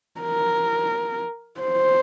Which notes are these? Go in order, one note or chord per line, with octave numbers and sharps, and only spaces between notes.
A#4
C5